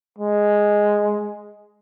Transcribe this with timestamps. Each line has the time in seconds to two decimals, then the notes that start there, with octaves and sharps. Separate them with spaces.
0.18 G#3